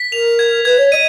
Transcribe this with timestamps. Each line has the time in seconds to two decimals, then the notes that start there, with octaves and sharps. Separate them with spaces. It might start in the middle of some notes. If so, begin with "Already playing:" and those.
Already playing: B6
0.12 A#4 F7
0.39 G#6
0.65 B4 G#6
0.78 C#5
0.92 D#5 D#7